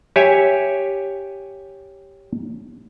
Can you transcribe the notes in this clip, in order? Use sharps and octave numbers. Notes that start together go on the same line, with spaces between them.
G4 C#5 E5 G#5